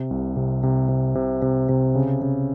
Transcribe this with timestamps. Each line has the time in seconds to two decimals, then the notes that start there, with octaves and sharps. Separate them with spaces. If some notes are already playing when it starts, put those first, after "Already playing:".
Already playing: C3
0.11 C2
0.36 C3
0.63 C3
0.89 C3
1.15 C3
1.42 C3
1.69 C3
1.95 C#3
2.22 C#3